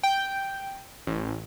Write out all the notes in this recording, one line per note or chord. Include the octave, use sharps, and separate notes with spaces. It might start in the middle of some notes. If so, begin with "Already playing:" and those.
G5
A1